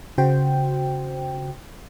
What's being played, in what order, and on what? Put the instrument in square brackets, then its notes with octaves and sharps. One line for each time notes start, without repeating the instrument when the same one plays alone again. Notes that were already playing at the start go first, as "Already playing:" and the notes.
[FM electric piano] C#3 F#4 C5 G5